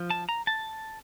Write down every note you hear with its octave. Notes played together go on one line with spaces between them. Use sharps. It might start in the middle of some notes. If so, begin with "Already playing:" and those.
Already playing: F3
A5
A#5
A5